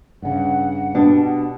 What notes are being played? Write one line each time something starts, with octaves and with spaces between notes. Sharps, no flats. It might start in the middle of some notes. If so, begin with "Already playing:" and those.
G2 C#3 F#5
B2 D4 G4